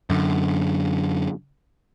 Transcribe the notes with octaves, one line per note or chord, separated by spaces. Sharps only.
F#2 D3